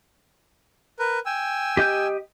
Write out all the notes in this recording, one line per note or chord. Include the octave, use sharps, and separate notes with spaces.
A#4 B4
G5 G#5 E6
G4 D#5 G6